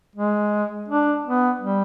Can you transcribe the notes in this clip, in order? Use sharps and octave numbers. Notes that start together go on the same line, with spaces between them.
G#3
D4
B3
G3